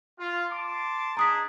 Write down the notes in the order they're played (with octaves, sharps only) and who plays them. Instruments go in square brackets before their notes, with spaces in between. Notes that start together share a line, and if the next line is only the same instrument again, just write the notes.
[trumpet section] F4
A5 C6 D6
[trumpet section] D4 D#4 G#4 [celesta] A#5 D#6 B6